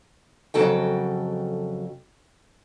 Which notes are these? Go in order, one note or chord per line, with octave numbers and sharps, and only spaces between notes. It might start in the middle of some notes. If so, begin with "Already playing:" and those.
F2 C#3 F#3 F#4 A4 G5